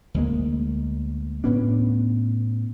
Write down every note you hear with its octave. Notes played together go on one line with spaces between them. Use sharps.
D2 G#3 A#3
A2 B3 C#4 D4